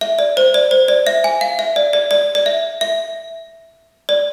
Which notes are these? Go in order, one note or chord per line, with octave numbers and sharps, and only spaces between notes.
E5
D5
C5
D5
C5
D5
E5
G#5
F5
E5
D5
D5
D5
D5
E5
E5
D5